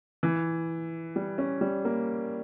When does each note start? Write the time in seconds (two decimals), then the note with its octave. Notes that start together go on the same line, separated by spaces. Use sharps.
0.23 E3
1.16 G3
1.38 C#4
1.61 G3
1.85 A#3